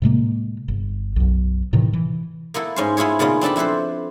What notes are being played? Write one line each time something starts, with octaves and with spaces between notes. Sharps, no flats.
A2 C3 G#3 A#3
G1
B1 F#2
A2 C3 D#3 E3
E3
A#3 B3 E4 A4
G#2 C#4 C5
B3 E4 F4 G#4 C#5
A#2 C#3 G#3 B3 D#4
C4 D4 A4 A5 B5
F2 E4 A4 B4 C5